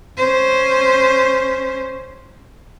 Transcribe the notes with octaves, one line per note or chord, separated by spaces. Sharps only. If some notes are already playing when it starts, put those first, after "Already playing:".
C#4 C5